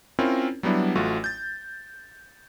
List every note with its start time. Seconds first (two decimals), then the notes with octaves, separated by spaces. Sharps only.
0.19 C4 C#4 E4 F4 A#4 C#5
0.63 F#3 G3 B3 D4 E4
0.95 A1 A3 F4 F#4
1.24 G6 A6